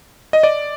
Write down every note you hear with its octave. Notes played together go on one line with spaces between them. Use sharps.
D#5
D5